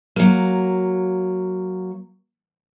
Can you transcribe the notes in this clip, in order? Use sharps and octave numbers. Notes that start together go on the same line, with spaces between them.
F#3 A#3